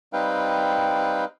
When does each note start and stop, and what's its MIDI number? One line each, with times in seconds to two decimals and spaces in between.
0.13 1.25 55
0.13 1.25 60
0.13 1.25 63
0.13 1.25 71
0.13 1.25 77
0.13 1.25 79